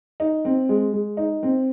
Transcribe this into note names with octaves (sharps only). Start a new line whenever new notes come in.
D#4
C4
G#3
G#3
D#4
C4